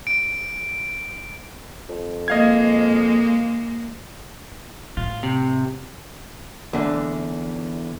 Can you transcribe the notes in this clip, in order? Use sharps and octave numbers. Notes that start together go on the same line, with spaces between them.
D7
F2
G#3 A#3 D#5 F5 G#6
A2 F4
C3
E2 D3